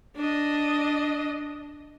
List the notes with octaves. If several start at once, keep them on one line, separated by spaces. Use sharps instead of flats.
D4 D#5